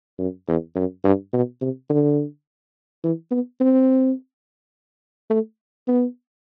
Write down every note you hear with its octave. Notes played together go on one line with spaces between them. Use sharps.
F#2
E2
F#2
G2
B2
C3
D3
E3
B3
C4
A3
B3